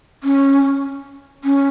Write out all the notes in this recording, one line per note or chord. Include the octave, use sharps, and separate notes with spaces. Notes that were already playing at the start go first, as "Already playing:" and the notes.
C#4
C#4